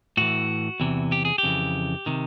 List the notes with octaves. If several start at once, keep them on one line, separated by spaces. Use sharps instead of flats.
A2 E3 F#4
E2 C3 E3
G4
G#4
G4
F2 C#3 E3
C3 D#3